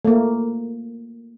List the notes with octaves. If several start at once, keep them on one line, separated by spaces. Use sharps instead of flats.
A3 A#3